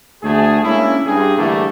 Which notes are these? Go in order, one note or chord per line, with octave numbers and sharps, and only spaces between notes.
D2 A3 G#4
G#3 A#3 C#4 D4 E4
G2 G#4
A2 D3 E3 G3 A3 A#3